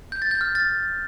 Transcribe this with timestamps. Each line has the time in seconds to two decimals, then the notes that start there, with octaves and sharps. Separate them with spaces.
0.12 G6
0.22 A6
0.31 G6
0.41 F6
0.55 A6